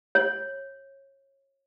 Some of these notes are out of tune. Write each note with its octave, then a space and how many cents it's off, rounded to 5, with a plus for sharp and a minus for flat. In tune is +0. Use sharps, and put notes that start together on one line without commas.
C#5 -25